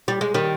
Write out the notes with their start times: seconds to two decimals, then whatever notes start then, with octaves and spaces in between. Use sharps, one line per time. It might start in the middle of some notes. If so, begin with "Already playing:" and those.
0.08 G3
0.21 G#3
0.34 D#3 G3